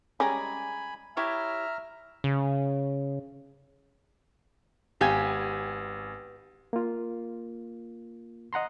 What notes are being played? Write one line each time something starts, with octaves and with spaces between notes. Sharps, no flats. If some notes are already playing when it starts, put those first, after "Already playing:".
G3 G#3 C#4 G#4 G#5 A#5 B5 D6
E4 G4 C#5 E5 A#5 F6
C#3
G#1 B3 G4 F5 G#5 G#6
A#3 F4
D#5 F#5 A#5 C6